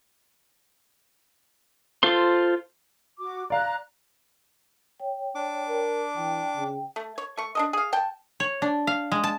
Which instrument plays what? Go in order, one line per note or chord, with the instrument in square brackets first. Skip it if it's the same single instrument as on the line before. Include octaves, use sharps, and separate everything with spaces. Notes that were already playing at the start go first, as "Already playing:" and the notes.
[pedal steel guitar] F4 A4 C5 C6
[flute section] F#4 D6
[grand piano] D5 F5 [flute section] A#5 F#6
[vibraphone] C#5 G5
[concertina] D4 D6
[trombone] A#4
[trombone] E3 [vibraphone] G5
[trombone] C#3
[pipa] A3
C#5
A3 C#6
D4 A4 D#5
G#4 F5
G5 A5
[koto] C#5
D4
F5
G#3
A5